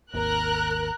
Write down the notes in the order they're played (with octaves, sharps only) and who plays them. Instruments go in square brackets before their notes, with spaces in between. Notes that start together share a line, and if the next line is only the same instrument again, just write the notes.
[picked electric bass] G#1 D#2 [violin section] A#4 F#6